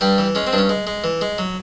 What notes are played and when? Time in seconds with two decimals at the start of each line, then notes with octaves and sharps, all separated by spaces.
0.01 G2 G3 G4
0.18 E3
0.35 G#3 C#4
0.47 C4
0.53 G2 D4
0.58 C#4
0.69 G#3
0.87 G#3
1.04 E3
1.21 G#3
1.38 F#3